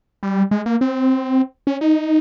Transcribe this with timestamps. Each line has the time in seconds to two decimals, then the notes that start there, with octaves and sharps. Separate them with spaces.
0.23 G3
0.51 G#3
0.66 A#3
0.81 C4
1.67 C#4
1.81 D#4